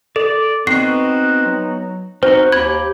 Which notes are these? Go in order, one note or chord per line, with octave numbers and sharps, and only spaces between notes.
A4 D5
B3 C4 D#4 F#4 C7
F#3
C4 D#4 F#4 C5
D#2 G4 B5 G#6